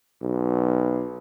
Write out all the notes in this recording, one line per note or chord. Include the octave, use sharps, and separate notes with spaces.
B1